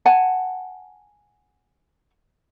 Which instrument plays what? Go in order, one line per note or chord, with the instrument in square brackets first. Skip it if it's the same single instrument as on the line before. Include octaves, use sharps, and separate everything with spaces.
[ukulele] F#5 G#5 A5